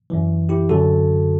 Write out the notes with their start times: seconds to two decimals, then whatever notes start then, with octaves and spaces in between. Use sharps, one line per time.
0.10 F#2 E3
0.49 E4 G4
0.69 F#2 D3 F#4 A4